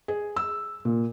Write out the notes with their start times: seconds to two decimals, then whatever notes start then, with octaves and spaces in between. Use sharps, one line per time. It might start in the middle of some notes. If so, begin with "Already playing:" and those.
0.08 G#4
0.36 E6
0.85 A#2